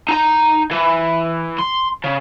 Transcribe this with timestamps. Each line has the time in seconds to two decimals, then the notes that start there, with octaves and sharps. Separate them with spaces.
0.08 D#4 A#5
0.71 E3
1.59 C6
2.04 C#3